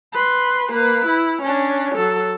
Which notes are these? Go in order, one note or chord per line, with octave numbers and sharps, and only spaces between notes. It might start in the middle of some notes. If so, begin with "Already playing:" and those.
B4 C6
A#3 B4
E4
C#4 D4
F#3 A4